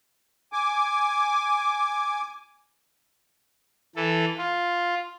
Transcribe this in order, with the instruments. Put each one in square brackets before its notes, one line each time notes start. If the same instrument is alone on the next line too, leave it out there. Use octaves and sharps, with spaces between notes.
[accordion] G#5 D6
[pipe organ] E3 A4
F4